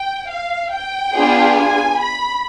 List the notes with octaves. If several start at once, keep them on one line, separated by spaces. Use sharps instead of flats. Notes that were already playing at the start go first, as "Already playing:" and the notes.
Already playing: G5
F5
G5
B3 D4 F4 G#4
G#5
B5